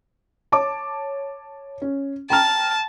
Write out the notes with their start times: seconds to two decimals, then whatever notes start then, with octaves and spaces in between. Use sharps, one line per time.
0.52 C#5 A5 D6
1.82 C#4
2.30 G5 A5 A#5 F6